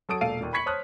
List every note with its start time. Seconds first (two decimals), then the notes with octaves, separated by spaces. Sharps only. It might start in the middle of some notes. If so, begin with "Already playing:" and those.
0.09 F#3 A4 D#6 D7
0.21 E1 A#2 A4 F5 D7 D#7
0.41 D#2 A#2
0.53 B5 C#6 G#6 B6 C#7 F#7
0.66 C5 C#5 A5 D#6 F6 F#6